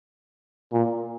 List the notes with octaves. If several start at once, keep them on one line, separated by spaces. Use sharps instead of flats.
A#2